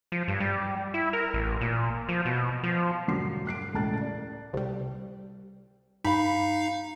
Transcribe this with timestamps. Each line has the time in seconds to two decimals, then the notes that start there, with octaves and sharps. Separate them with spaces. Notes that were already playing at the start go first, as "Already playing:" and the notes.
0.12 F3
0.28 G2
0.40 G3
0.94 E4
1.13 A#4
1.34 A1
1.61 A#2
2.09 F3
2.25 B2
2.64 F3
3.07 E1 G2 D3 F#3 D6 C7
3.47 F#6 C7 D7
3.74 E1 C#2 A2 A5 F#6 A6
4.01 D5
4.53 C2 G3
6.04 G2 D#4 F5 B5